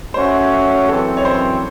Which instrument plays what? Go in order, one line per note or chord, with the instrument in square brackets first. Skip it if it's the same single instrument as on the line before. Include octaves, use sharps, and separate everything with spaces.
[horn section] A3 C#4 F#4 C#5 E5 [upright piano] C5
[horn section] F#2 E3 C4 [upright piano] A4
[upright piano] C#5
C5